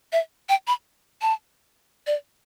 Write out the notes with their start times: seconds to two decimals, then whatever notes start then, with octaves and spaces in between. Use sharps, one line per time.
0.12 E5
0.49 G5
0.67 B5
1.22 A5
2.07 D5